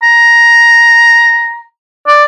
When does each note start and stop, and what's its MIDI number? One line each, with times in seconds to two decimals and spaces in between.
0.03 1.62 82
2.07 2.24 74